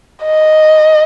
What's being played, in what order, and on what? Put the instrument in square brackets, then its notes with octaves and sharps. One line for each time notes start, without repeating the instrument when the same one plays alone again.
[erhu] D#5